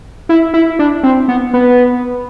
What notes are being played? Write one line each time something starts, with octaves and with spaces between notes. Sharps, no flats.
E4
E4
D4
C4
B3
B3